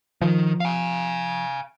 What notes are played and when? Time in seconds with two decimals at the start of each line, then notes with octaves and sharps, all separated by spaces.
0.22 D#3 F3
0.60 F5 G#5